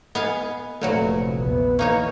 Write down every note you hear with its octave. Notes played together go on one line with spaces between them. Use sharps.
B3 D#5 F5 G#5
F1 A#2 F#3 A3 F#4 B4
A#1 E2 C3 B3 B4
E3 A#3 D#4 C#5 F5 C#6